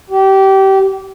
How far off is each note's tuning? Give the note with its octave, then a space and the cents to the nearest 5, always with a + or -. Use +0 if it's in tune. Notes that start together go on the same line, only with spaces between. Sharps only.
G4 -25